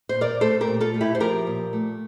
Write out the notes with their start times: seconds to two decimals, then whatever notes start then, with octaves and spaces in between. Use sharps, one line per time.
0.09 C5
0.14 A#2
0.21 A#4 D5
0.41 A3 A4 C5
0.61 G4 A#4
0.68 A#2
0.81 F4 A4
0.94 A3
1.01 E4 G4
1.15 C5
1.20 F3 G4 A#4
1.47 A#2
1.73 A3